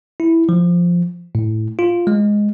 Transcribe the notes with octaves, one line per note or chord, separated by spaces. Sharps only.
E4
F3
A2
F4
G#3